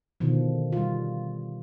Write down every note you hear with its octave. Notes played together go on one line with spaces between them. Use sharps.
B2 D3 D#3 F3
G3 F4